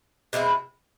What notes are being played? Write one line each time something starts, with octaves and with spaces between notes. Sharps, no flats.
B2 G#3 C4 E4